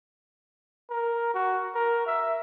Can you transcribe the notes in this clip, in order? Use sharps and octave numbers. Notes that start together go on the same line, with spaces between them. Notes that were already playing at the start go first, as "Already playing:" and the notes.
A#4
F#4
A#4
E5